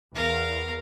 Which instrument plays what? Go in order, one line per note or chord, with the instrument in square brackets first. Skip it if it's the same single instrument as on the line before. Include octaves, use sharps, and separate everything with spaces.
[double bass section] E2 [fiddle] A#4 F5